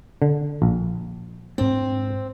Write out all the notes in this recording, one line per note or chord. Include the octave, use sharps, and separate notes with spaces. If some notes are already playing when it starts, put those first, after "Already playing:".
D3
A#1
G#2 C4 D4